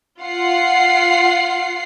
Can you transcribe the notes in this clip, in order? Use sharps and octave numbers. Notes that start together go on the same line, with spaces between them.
F4 F#5 C7